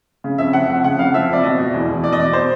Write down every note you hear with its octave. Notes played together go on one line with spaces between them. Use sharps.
C#3
F2 E5
F3 F#5
F2
C#3 F#5
F2 F5
F3 E5
F2 D5
B2 D#5
B2
E2
E2
B2 D5
D#5
B2 D5
C5